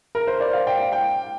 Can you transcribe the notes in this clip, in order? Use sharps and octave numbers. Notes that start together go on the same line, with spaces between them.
A#4
C5
D5
F5
G5
F5
G5